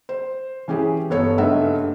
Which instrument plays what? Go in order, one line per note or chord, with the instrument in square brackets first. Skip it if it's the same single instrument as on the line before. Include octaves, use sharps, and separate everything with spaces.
[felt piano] C5
E3 C#4 G4 G#4
G1 B3 A4 C#5
F#1 G2 A3 D#4 E5 F#5